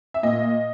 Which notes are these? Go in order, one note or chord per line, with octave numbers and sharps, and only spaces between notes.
E5
A#2 D#5